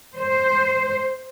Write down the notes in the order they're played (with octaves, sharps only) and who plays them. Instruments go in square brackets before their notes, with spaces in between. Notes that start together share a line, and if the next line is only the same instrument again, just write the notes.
[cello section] C5